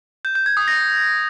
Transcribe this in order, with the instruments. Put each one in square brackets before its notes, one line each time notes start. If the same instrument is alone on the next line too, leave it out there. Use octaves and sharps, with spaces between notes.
[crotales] G6
G6
G#6
D#6
A#6